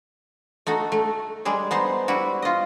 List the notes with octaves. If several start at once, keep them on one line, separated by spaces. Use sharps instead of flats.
A3 D#4 F#4
A3
G3 G#3 G#4
B3 D#4 C5
G3 E4 F#4
F4 D#5